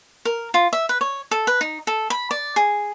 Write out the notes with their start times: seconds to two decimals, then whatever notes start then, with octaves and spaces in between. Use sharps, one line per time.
0.25 A#4
0.54 F4
0.73 E5
0.89 B4
1.01 C#5
1.31 A4
1.47 B4
1.61 D#4
1.87 A4
2.10 B5
2.31 D5
2.56 G#4